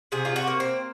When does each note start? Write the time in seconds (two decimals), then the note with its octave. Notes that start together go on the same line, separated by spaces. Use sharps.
0.12 C3 G#4
0.25 F4
0.36 F#4
0.47 A#3
0.60 C4